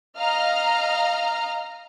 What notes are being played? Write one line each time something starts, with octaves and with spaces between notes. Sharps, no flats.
D#5 F5 A#5 F6